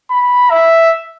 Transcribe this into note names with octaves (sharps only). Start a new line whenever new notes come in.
B5
E5